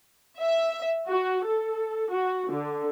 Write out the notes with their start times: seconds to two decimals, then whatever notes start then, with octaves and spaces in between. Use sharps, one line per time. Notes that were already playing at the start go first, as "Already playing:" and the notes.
0.40 E5
1.08 F#4
1.46 A4
2.12 F#4
2.51 D3